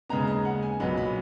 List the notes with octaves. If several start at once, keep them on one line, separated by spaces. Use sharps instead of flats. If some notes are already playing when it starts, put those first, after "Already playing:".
D#2 C#3 G#3 B3 A#5
D#5
F#5
G#5
B1 A#2 F#3 B3 B5
B5